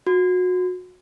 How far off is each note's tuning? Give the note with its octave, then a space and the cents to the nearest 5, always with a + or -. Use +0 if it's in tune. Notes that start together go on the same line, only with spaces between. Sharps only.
F#4 -25